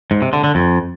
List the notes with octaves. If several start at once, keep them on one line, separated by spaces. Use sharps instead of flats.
G#2
C3
D3
D3
F2